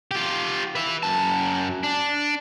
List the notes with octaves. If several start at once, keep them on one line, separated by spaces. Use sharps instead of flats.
F4 G4
B4 E5
F#2 A5
D4